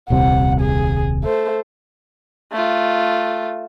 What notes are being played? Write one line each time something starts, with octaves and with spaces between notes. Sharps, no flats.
D#1 C2 C3 F#5
G#4
A3 C5
A3 F4